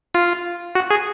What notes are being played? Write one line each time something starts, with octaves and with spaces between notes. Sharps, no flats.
F4
F#4
G#4